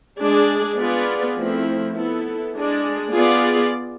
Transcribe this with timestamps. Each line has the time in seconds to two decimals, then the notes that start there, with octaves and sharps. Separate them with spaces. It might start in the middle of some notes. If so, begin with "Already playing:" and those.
0.18 G#3 D4 G#4 D5
0.77 B3 F4 G#4 B4 D5
1.37 F3 A3 C4 E4
1.95 B3 E4 A4
2.54 G#3 D4 G#4 D5
3.13 B3 F4 G#4 D5